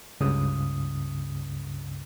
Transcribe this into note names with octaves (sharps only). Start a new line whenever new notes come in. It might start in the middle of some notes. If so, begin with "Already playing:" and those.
C#2 G2 C#3 D#6